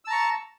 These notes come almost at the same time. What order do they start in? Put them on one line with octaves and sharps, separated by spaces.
E6 A5 A#5 C#6